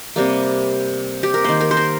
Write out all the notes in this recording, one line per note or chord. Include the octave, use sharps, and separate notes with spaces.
C3 G3 A#3
G4
A#4
D#3 A#3 C5
A#4
C5
A#4